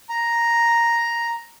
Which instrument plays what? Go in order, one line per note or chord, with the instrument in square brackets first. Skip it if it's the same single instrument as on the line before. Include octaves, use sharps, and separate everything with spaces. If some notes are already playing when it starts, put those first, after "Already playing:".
[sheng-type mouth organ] A#5